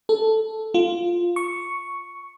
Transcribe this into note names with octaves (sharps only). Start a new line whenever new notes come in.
A4
F4
C#6